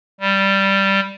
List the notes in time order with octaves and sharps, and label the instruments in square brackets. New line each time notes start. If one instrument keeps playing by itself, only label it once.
[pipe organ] G3